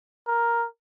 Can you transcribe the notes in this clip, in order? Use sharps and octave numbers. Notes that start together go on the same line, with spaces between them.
A#4